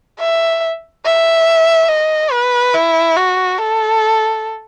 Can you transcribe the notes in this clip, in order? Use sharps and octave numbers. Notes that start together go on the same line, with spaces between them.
E5
E5
D#5
B4
E4
F#4
A4